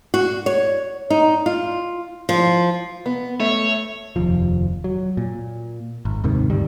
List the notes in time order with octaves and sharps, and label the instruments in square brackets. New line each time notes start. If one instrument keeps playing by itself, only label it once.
[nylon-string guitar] F#4
C#5
D#4
F4
F3
[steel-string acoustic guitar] B3
[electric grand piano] A3 [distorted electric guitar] C#5 [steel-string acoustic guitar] E5
[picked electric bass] F1 D#2 F3
F#3
A#2
G#1
D#2 G#2 C3 D#3
D2 G2 D#3 G3